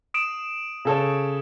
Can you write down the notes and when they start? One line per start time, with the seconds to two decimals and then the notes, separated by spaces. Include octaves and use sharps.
0.14 D#6 D7 E7
0.85 C#3 A4 C#5